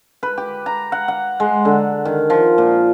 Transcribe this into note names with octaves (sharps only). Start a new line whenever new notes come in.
B4
G4
A#5
F#5
F#5
G#3
D3
D#3
F3
A#2